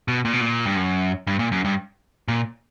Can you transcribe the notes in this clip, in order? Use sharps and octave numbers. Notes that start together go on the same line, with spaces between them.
B2
A#2
B2
A#2
G2
F#2
G2
A#2
F#2
G2
A#2